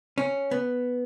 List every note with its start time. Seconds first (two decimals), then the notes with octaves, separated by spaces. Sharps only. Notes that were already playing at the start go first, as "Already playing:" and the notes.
0.18 C#4
0.51 B3